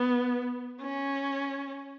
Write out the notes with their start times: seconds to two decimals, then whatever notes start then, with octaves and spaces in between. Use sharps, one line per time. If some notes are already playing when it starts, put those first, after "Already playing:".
Already playing: B3
0.81 C#4